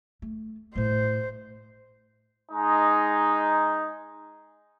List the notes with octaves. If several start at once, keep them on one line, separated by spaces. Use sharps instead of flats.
A3
A2 A3 C5
G#3 D#4